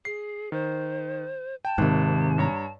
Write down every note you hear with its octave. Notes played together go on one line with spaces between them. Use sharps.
G#4 C7
D#3 C5
G5 A5
G#1 G#2 C3 D#3 F#6
G2 C#5 A#5